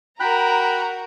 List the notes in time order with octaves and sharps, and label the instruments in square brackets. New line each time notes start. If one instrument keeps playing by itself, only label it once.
[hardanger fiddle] F#4 A#4 [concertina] G5 B5 F#6 [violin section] A#5